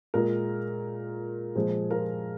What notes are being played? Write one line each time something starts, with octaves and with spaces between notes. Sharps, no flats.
A#2 G#3 F4 A#4
A#2 F3 G#3 G#4 C5
F4 A#4